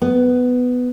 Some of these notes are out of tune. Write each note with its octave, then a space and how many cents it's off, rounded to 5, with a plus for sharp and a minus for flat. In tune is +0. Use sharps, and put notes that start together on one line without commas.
B3 +10